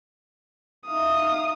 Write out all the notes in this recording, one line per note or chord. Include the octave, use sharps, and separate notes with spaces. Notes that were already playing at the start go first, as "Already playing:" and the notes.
D#4 E5 F5 D#6